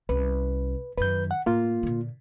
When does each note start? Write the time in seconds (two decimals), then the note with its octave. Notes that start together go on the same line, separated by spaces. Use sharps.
0.09 C2 C#4 B4
0.98 F#2 D#3 B4 G6
1.31 F#5
1.46 A2 A#3 F4
1.83 A#2 D3